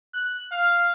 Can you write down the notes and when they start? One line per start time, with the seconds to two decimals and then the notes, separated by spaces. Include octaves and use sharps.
0.14 F#6
0.52 F5